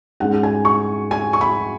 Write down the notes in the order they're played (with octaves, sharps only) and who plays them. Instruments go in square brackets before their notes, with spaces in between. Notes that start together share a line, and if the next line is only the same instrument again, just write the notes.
[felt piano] G#2 G#3 C#4 F#5
G#5
C#6
G#5
C#6
B5